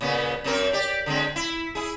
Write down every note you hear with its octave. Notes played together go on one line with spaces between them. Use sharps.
A#2 C#3 B3
F#2 C4 A#4
G4 D5
D3 G#3 C4
E4
E4 G#4